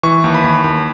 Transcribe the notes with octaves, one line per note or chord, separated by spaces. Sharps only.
E3 C#6
D#2
B5
D#2
D#2